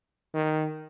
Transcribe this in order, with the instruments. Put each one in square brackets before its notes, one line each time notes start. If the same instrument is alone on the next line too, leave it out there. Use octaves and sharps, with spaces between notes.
[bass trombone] D#3